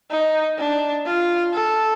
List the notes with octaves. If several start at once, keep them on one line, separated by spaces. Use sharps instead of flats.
D#4
D4
F4
A4